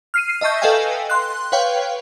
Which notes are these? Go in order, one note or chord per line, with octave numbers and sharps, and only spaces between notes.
F6 C7 D#7
D#5 E5 A5 C#6 G6
A4 B4 D#5 F5 G5 G#5
C6 F#6
B4 C#5 F5 G5